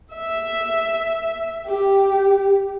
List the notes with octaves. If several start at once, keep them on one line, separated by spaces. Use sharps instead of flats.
E5
G4